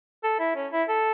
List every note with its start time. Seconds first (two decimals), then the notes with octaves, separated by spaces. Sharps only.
0.24 A4
0.40 E4
0.56 C#4
0.72 E4
0.89 A4